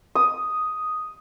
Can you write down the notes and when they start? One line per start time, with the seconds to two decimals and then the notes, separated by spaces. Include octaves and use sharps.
0.15 D#6